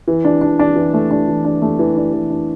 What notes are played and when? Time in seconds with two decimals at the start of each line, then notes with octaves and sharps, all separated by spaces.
0.08 E3
0.25 D4
0.41 D4
0.59 D4
0.76 E3
0.94 A3
1.11 D4
1.28 E3
1.45 D4
1.62 A3
1.79 E3
1.96 D4
2.13 E3
2.30 D4